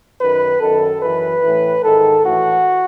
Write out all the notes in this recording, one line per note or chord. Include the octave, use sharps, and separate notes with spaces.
F#2 D#3 B4
F#2 D#3 A4
F#2 E3 B4
A2 E3
G#2 D#3 A4
A2 E3 F#4